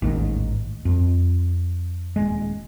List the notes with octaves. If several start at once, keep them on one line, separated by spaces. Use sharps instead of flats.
A1 D#2 G#2 D#3
F2
D#1 G#3